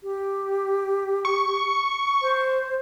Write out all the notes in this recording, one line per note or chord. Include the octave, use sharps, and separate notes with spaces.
G4
C#6
C5